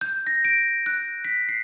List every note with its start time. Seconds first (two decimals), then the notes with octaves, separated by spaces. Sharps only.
0.01 G6
0.27 A#6
0.45 D7
0.86 F#6
1.25 B6
1.49 C7